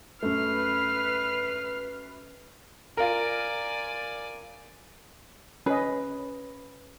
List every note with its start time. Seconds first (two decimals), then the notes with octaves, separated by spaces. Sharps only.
0.22 F#2 A3 B4 F6 C7
2.97 F4 A#4 D5 G#5
5.66 C#4 B4 D#5